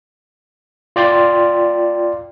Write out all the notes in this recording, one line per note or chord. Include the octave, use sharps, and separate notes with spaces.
F4 D5 G5 C6